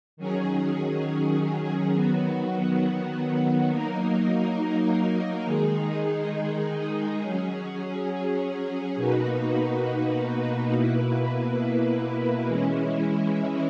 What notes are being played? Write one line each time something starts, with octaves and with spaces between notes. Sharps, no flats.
D#3 F#3 C#4 G#4
D#3 F#3 B3 F#4
F#3 A#3 D#4 A#4
D#3 G#3 D#4 G#4
F#3 C#4 G#4
B2 A#3 D#4 F#4 B4
B2 A#3 E4 B4
E3 G#3 C#4 E4